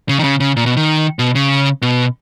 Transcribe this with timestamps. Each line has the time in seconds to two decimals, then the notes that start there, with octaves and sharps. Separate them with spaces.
0.09 C#3
0.19 D#3
0.24 C#3
0.40 C#3
0.56 A#2
0.66 B2
0.77 D#3
1.19 B2
1.35 C#3
1.82 B2